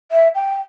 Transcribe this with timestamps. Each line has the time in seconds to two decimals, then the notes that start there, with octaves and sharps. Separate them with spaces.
0.12 E5
0.35 G5